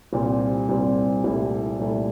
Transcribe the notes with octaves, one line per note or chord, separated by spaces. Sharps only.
C2 A#2 G3 C4
C2 A#2 G3 C4
C2 A#2 A3 E4
C2 A#2 A3 E4